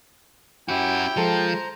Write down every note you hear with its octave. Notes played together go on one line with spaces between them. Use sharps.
C#4 E4 F#4 G4 G5
F3 G#3 A4 C5 A#5 G6